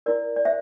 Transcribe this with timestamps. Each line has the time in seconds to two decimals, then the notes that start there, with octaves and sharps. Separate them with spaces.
0.06 E4 A#4 D5
0.36 D5
0.45 C5 E5